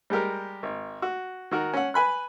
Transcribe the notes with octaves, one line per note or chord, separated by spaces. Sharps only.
G3 G#3 G4 A#4
G#1
F#4
D#3 F#4 A#4
C#4 F#5
B4 G#5 B5 F#6